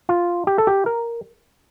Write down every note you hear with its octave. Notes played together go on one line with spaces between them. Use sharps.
F4
G4
A4
G4
A#4